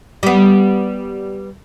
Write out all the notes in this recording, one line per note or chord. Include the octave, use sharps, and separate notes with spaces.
G3 B3